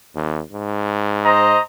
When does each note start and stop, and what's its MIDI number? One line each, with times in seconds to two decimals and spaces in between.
0.15 0.42 39
0.53 1.56 44
1.25 1.59 72
1.25 1.59 75
1.25 1.59 82